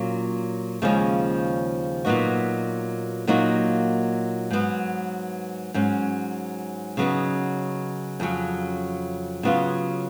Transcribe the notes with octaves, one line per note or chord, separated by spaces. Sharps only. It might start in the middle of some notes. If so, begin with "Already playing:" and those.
Already playing: A#2 F#3 C#4 F4
D#2 C#3 F3 G#3 C#4
A#2 F#3 B3 D#4 F#4
A#2 F#3 A#3 D#4 F#4
G#2 F#3 B3
G#2 F#3 C#4
C#3 F#3 B3 D#4
F2 C#3 F#3 C#4
C#3 F#3 B3 F4